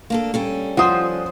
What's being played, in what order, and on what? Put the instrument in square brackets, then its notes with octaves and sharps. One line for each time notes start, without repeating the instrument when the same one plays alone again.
[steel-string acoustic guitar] A#3 D4 A4
G3 C#4 A4
[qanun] F3 C5 [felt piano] F#5 D#6